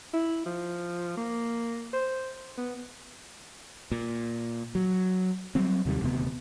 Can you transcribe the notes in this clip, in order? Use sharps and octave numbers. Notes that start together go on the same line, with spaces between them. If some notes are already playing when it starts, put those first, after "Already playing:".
E4
F3
A#3
C5
B3
A#2
F#3
F#3 G3 C4
D#2 C3 D#3 G3
D#1 D2 C3 B3